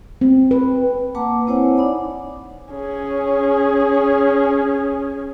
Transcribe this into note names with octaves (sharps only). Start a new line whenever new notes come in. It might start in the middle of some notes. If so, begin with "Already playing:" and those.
C4
B4
A#3 B4 F#5 A5 A#5 D6
C4 E4 C5 C#5 F#5 G#5
D#4 C#5 D5 F#5 B5 D6
C#4 G#4